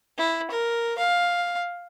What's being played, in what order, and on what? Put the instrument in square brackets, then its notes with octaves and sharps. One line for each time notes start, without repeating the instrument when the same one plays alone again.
[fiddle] E4
A#4
F5